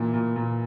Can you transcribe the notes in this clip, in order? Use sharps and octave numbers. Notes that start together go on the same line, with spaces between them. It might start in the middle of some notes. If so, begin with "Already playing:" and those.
Already playing: A#2 E3
A#2
A#2